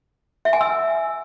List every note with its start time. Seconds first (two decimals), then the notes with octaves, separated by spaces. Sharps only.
0.45 E5
0.53 G#5
0.61 E6